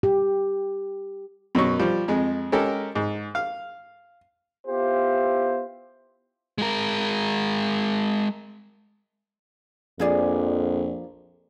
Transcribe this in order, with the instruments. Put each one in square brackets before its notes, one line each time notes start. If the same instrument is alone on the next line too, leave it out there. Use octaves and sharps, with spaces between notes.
[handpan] G4
[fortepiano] F#2 B2 F#3 C#6
F3 G3
F2 G#3
G#3 C#4 G4 A4 A#4
G#2
F5
[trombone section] B3 E4 F4 G4 C5
[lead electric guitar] G#3 A#4
[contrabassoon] A#1 [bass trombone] F2 [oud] F3 G#4 D5